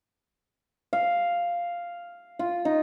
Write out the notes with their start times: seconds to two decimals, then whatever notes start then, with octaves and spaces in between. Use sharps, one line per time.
0.93 F5
2.39 F4
2.65 D#4